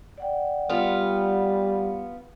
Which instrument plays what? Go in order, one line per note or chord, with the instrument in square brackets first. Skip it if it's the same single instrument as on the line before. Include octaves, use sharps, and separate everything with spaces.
[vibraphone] D5 F#5 G5
[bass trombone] G3 [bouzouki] B3 F4